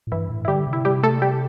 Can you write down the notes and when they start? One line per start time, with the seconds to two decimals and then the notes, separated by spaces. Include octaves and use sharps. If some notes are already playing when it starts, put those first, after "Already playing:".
0.07 A2
0.12 G2 E3 E4
0.30 A2
0.45 E4
0.48 D3 G3 G4
0.67 C3
0.73 E4
0.85 G3 G4
1.03 A3 A4
1.22 G3 G4